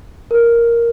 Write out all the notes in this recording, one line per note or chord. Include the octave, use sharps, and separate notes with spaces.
A#4